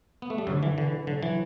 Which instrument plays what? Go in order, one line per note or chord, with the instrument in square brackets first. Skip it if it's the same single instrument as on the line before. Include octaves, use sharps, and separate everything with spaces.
[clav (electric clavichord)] B3
A3
G3
[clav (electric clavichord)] F#2 F#3 [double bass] D3
[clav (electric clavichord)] E3
[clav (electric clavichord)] D3 [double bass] E3
[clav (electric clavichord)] D3 [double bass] F#3
[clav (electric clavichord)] E3